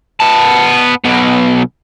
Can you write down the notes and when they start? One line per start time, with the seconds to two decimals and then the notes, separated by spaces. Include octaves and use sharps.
0.20 B3 A5
1.05 B1 B2